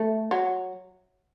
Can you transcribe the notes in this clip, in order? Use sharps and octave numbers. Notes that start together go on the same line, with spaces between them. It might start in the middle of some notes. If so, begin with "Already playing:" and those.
Already playing: A3
F#3